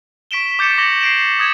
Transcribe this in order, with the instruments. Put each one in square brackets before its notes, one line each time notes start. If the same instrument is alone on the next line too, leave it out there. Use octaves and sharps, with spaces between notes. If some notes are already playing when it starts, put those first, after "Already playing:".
[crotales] C#6 B6 D7 E7 G7
D6 G6 A6 C#7 D7 E7
C#6 D6 A#6 F#7 G7
C7 D7 E7
D#6 G#6 E7